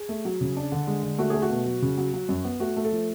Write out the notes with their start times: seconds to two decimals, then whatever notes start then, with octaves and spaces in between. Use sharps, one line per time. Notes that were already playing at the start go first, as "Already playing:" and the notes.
Already playing: G#4
0.09 A3
0.25 F#3
0.41 C#3
0.57 D4
0.72 D3
0.87 G#3
1.03 D3
1.18 A3 F#4
1.30 A3 G#4
1.42 F#4
1.50 B2
1.66 F#3
1.82 C#3
1.98 F#3
2.14 F#3
2.29 F#2
2.44 B3
2.60 A3 F#4
2.77 A3
2.85 A4
2.92 F3